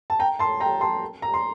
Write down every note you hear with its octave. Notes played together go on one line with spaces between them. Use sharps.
A5
G5 A#5
A5 C6
G5 A#5
A5 C6
A#5
C6